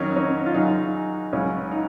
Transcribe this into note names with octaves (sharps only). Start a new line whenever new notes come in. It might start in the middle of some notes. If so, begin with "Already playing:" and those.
Already playing: F2 D#3 F#3 C#4 D#4
C#4
F4
F#2 C#3 F#3 D#4
C#2 C#3 F#3 C#4
D#4